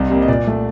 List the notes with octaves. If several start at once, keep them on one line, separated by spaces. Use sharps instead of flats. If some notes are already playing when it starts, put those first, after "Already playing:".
Already playing: C2 D#5
C3 G3 A#3
D#5
A#2 D5
A3